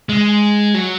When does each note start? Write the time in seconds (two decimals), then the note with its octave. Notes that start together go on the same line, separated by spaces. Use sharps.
0.09 G#3
0.74 F#3